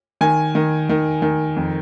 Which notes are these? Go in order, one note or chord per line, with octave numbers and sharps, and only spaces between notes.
D#3 G#5
D#3
D#3
D#3
F2